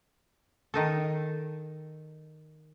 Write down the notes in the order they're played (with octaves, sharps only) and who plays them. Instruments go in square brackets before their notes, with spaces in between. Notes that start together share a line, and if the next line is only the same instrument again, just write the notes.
[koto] D#3 D#4 A4